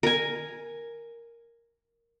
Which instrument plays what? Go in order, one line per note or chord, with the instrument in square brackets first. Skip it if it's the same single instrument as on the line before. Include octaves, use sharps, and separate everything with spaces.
[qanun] A#4 G#5